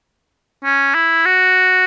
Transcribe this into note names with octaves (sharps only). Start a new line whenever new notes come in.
C#4
E4
F#4